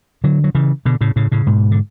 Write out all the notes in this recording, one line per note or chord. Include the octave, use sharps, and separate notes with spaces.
D3 F#3
F#3
C#3 E3
B2 D3
A2 C#3
A2 C#3
A2 C#3
G#2 B2
D3